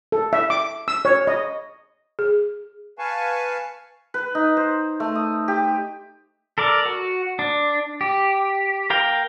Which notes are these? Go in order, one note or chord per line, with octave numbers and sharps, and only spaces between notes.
A4
E5
D6
E6
C#5
D#5
G#4
B4 F5 G#5 A5 C#6
B4
D#4
C5
A3
D#6
G4
A4 A#4 D5
F#4
D4
G4
A#4 F5 G5